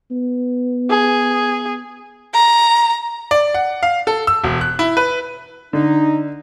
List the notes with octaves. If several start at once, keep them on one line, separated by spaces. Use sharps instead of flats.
B3
G#4
A#5
D5
F#5
F5
A4
E6
E1
F#6
E4
B4
D3 D#4